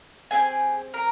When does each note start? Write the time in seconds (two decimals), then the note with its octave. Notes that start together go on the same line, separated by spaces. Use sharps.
0.31 C4 G4 G#4 G#5
0.94 A#4 A#5